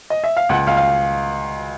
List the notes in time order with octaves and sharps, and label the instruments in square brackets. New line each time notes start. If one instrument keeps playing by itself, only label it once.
[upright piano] D#5
E5
F5
C#2 F#5
C#2 F5
F5